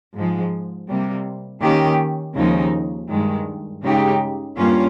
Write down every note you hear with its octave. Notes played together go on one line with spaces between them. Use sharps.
G#2 F3 G#3
C3 G3 A#3
D#3 A#3 C#4 G4
D#2 C#3 F3 G#3 D#4
G2 D#3 G#3
C#3 G#3 D#4 G4
G2 G3 A#3 C#4 F4